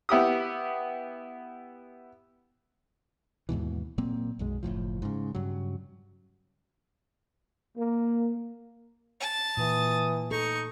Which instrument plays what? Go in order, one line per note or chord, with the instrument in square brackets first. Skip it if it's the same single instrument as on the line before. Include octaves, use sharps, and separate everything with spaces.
[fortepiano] B3 E4 G4 D#6
[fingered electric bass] D#2 G#2 B2 E3
A#2 F#3 A#3 C4
B1 F#2 G#3
F#1 C#2 A2 F3
G#2 C#3
G2 C#3 F#3
[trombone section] A#3
[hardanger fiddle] A5
[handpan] A#2 [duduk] E3 [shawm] D#6
[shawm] D#4 [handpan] A4 [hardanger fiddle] C#6